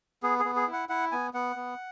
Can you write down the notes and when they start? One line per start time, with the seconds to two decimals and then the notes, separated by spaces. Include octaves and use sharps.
0.23 B3 G#4
0.39 G#4
0.45 B3
0.56 G#4
0.67 E4
0.73 F#5
0.89 E4 F#5
1.12 B3 G#5
1.34 B3 F#5
1.56 B3